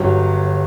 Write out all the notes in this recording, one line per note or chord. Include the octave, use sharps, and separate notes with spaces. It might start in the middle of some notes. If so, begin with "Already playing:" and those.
Already playing: G1 F#3 G4